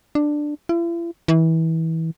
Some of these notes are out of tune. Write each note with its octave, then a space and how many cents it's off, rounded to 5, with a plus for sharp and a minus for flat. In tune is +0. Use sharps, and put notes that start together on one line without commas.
D4 +10
E4 +45
E3 -25